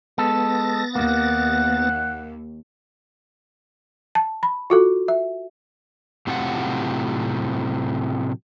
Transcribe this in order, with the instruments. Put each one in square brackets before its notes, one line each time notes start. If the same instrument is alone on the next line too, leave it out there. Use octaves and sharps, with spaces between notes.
[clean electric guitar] G#3 A4 [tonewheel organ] B3 A6 A#6
[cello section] D#2 [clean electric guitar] A#3 [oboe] F#5
[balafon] A5
B5
F4 F#4 A4
E5
[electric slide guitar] A2 C3 F#3 C4 F4 F#5